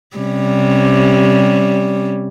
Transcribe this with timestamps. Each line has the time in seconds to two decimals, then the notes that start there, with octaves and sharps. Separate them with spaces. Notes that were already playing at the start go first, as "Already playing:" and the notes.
0.16 C3 G3 C#4